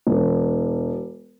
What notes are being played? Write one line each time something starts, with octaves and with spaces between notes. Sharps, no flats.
E1